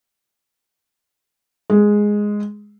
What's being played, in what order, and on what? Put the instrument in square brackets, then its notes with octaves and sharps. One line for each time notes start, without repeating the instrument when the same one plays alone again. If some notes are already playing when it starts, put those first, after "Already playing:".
[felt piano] G#3